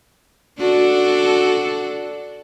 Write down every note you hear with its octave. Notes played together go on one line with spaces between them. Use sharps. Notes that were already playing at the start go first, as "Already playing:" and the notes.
D4 F#4 A4